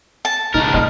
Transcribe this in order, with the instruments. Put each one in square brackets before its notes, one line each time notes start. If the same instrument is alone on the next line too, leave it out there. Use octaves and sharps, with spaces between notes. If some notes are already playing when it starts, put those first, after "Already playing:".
[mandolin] A5
[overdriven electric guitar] C#2 A#4 [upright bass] A#2 [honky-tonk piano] D#4
[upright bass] F2 A#2 [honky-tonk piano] D#5 F6